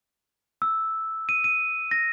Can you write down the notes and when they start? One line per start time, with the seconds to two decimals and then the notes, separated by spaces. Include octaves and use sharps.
0.62 E6
1.29 D#7
1.44 D#7
1.91 A#6